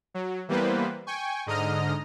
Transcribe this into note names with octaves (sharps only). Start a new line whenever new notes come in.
F#3
E3 G3 A#3 B3 B4 C5
G5 G#5 C#6
G#2 D3 D#5 A#5 D#6 F6